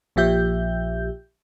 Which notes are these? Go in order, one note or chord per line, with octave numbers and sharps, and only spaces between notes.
A#1 A#2 F3 G4 E5 G6